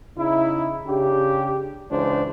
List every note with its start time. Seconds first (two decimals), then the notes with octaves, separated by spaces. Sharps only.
0.18 C#3 D#4 E4
0.87 C#3 D4 G4
1.91 C#2 E3 D4 C5